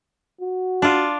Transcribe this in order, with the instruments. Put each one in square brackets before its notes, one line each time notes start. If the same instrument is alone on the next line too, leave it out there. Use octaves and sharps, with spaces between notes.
[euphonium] F#4
[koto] D4 F4